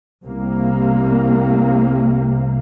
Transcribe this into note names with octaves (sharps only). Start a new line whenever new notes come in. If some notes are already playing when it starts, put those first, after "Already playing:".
C2 C3 A#3